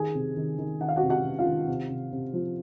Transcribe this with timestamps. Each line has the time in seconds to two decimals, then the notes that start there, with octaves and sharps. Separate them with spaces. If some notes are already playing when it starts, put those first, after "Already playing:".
Already playing: D#3 G#4 G#5
0.15 C3
0.36 D#3
0.58 D#3
0.80 D#3 F#5
0.89 F5
0.96 F#4 F#5
1.03 C3
1.10 F#4 F#5
1.24 C3
1.39 F4 F5
1.46 D#3
1.68 C3
1.90 C3
2.12 C3
2.33 F3